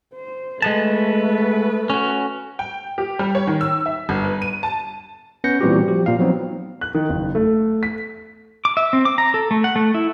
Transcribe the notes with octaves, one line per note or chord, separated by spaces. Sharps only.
C5
G#3 A3 B3 B4 A5
C#4 F#4
G5
G4
G3
C#5
D#3
E6
E5
G1
B4
D#7
A5
B3 C#4 B4 G6 A#6 C#7
A#2 E3 G3 C4 F#4 G4
F3 G4
A#2 F5
F3 F#3 B3 C4 D#4
F#6
D#3
F#1
A3
B6
D6
E5
C4
D6
A#5
A4
A3
F#5
A3
E4